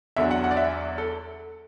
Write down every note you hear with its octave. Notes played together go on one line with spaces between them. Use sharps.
E2 D3 F#3 E5
F#5
F#5
D5
E5
A4